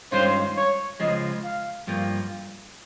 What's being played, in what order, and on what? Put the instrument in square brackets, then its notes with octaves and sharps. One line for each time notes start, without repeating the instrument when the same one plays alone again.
[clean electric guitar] G2 D#3 G#3 C#4 F4 [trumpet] C5
[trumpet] C#5
[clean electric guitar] C#2 C#3 F3 G#3 [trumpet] D#5
[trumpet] F5
[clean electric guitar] G2 F3 A#3